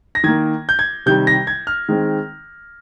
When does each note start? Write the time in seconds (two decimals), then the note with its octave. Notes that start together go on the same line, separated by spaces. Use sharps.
0.15 A#6
0.24 D#3 G#6
0.28 A#3
0.69 G6
0.79 G#6
1.06 C3 D#3 G3 G6
1.27 A#6
1.47 G#6
1.67 F6
1.89 D#3 G#3 C4